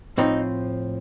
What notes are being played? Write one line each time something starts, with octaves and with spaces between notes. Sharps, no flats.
A2 F3 C4 D#4